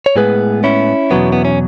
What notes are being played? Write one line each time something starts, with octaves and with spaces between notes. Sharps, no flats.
C#5
A2 G#3 B3 G#4 B4
C#4 E4
E2 B2 F#3 B3
B3
C#4